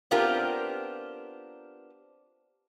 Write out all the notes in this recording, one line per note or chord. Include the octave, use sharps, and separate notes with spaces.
B3 C4 D4 F4 G4 A#4